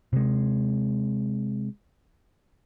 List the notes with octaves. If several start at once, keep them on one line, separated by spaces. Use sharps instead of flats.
C3 G#3